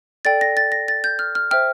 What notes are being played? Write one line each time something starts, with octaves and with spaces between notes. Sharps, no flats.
A4 D5 G5 A6
A#6
A6
A#6
A6
G6
F6
F6
C5 E5 G5 F6